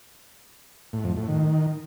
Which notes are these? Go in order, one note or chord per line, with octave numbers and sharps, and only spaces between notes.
A2
F2
A2
D#3